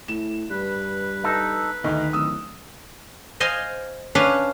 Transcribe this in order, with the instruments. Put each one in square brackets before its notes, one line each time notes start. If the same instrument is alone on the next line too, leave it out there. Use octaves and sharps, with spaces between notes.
[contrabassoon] A2 [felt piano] E7
[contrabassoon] G2 [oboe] B4
[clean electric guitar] D#4 A4
[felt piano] D2 D#4 [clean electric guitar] D#3
[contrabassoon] D1 [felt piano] D#6 E6
[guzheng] C5 D#5 F5 G#5 C6
C#4 D4 B4 F5